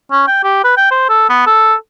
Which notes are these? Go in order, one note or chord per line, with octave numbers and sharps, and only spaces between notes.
C#4
G5
G4
B4
G5
C5
A4
B3
A4